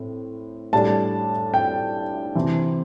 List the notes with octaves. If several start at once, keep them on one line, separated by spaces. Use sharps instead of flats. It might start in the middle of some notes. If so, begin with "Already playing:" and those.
Already playing: A2 C4
A2 G3 D4 A5
G5
C3 E3 C4